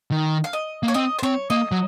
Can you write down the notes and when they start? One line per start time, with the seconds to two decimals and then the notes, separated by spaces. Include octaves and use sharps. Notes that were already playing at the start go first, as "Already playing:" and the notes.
0.11 D#3
0.44 F5
0.53 D#5
0.83 A#3
0.88 C#5
0.94 C4 D#5
1.19 C5
1.23 C4 C#5
1.50 A#3 D#5
1.72 F#3